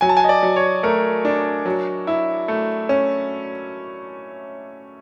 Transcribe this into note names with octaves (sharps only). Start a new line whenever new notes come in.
F#3 G#5
A5
G#5
D#5
D5
F#3
C#5
A3 A#4
D4
F#3
E4
A3
C#4